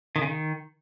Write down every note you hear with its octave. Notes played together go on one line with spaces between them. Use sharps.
D#3
C#3
D#3